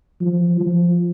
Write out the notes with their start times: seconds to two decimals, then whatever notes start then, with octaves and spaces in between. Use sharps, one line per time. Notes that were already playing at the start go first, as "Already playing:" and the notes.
0.21 F3
0.60 F3